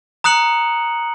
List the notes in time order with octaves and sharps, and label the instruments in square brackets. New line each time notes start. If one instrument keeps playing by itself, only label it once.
[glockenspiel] A#5 D#6 F#6 C#7 F#7